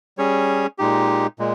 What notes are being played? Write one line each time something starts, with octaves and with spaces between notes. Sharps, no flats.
G3 C#4 G#4 C#5
A#2 G#3 D#4 G4
A#2 G#3